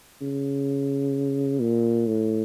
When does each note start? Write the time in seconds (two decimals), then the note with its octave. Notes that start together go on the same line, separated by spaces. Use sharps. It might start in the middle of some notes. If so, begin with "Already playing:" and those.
0.21 C#3
1.61 A#2
2.07 A2